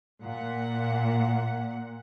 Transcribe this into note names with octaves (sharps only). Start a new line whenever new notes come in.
A#2 F#5